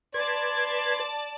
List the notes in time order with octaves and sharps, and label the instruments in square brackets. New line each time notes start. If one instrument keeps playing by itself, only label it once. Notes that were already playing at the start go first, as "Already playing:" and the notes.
[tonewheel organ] B4 G#6 [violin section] D5 A5 [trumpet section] C6